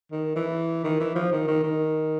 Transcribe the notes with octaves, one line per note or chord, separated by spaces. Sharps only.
D#3
E3
D#3
E3
F3
D#3
D#3
D#3